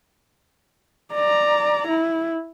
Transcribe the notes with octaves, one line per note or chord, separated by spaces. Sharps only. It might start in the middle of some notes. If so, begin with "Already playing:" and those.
D5 A#5
E4